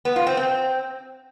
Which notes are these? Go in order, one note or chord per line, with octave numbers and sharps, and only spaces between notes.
B3
F4
C4
C4